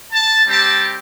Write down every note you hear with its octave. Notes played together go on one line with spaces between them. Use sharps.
A5
G3 C4 G4 A5